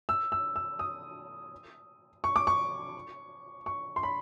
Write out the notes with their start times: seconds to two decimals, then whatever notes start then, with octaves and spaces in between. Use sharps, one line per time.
0.09 E6
0.32 E6
0.56 E6
0.79 D#6
2.24 C#6
2.36 D6
2.47 C#6
3.66 C#6
3.96 C6
4.03 B5